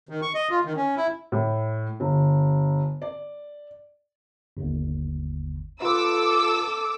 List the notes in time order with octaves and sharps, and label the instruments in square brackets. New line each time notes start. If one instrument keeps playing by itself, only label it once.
[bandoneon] D#3
C#6
D#5
F4
D#3
C#4
E4
[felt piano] A2
G1
D5
[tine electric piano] G1 D#2
[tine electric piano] F4 B4 [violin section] A4 D6 E6